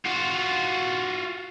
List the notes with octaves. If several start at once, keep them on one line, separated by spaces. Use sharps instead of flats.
F4 F#4